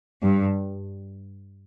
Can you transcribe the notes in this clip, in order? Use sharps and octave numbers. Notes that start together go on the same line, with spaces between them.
G2